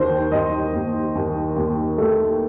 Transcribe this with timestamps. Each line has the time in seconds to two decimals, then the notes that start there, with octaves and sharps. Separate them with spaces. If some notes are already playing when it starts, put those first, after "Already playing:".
Already playing: D#2 D#3 C5
0.32 D#2 D#5
0.74 D#2
1.15 D#2
1.56 D#2
1.98 A3